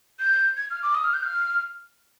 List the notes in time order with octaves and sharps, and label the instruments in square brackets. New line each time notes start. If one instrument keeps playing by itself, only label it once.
[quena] G6
G#6
F6
D6
D#6
F6
G6
F6